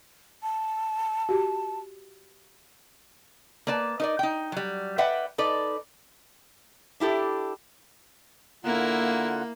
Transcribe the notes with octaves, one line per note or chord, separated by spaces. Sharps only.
A5
F#4 G4
A#3 B4 D5 A5
D#4 A#4 D5
D#4 G5
F#3 G3
B4 D5 E5 F#5 G5
D#4 A4 B4 D5
D4 E4 G4 A4
D3 A#3 E4 F4 A#4 F#5